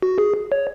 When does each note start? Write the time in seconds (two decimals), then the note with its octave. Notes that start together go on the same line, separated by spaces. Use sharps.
0.02 F#4
0.18 G#4
0.52 C#5